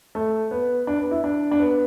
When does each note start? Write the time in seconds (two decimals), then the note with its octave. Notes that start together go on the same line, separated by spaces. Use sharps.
0.15 A3
0.51 B3
0.87 D4
0.99 B3
1.11 E4
1.24 D4
1.51 D4
1.60 B3